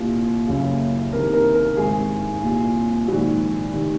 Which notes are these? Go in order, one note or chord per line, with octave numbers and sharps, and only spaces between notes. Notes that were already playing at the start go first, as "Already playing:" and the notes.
Already playing: C2 A#2
F#1 F#2 C#3
C2 C3 D#3 A#4
A#4
A#4
G#1 G#2 D#3 G#4
C2 A#2
A#1 G#2 D#3 F#4
F1 D#3